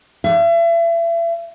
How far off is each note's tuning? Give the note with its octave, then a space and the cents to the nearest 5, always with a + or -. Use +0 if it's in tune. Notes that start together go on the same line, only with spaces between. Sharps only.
E5 +35